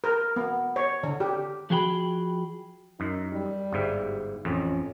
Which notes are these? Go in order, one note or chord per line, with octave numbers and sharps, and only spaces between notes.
A#4
B3
C#5
D3
G4
F3 F#4 G#4 G5 A#5 B5
F#2 D#4
G3
G1 G#2 E5
A1 F2 C#4